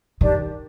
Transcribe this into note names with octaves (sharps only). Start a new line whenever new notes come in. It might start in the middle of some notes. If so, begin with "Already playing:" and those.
D#3 D4 G4 D5